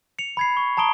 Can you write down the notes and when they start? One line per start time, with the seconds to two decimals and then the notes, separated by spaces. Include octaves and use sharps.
0.19 C#7 F7
0.37 B5 G#6 C7
0.57 C#6
0.77 A5 A#5 D#6 D7 G7